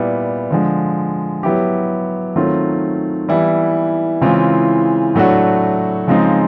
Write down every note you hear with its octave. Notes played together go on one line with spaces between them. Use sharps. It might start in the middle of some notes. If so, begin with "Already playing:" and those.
Already playing: A#2 G3 B3 E4
D3 F3 G#3
F#3 B3 E4 G4
D#3 F#3 A3 C4 F4
E3 G3 B3 E4
C#3 E3 G#3 C4 F4
A2 F#3 A3 D4 F#4
C#3 F3 G#3 C4 D#4